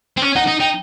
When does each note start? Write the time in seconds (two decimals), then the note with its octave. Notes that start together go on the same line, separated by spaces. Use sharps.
0.17 C4
0.22 C#4
0.36 D#4 F#5
0.47 D#4
0.60 D#4 G5